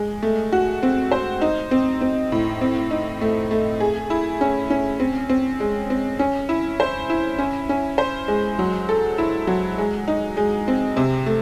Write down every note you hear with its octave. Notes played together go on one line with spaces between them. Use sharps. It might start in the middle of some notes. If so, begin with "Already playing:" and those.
Already playing: G#3
A3
F#4
C4
C5
D#4
C4
C4
A2
C4
D#4
A3
A3
G#4
E4
C#4
C#4
C4
C4
G#3
C4
C#4
E4
C5
E4
C#4
C#4
C5
G#3
F#3
A4
E4
F#3
G#3
D#4
G#3
C4
C3
A3